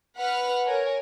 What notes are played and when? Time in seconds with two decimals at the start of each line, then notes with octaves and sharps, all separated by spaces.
0.18 B4 F#5 B5 F6
0.66 A#4 C#5 G#5